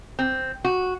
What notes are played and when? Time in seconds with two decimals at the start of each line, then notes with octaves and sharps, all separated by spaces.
0.19 C4
0.64 F#4